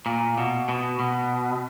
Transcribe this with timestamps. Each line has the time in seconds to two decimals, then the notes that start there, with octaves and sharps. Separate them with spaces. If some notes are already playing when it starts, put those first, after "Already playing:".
0.06 A#2
0.38 B2
0.69 B2
1.00 B2